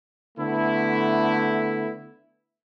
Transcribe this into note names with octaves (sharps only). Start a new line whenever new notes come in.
D3 A3 B3 E4